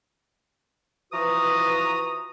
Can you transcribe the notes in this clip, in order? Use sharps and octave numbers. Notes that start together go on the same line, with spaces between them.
E3 F3 F#4 B4 A#5 D#6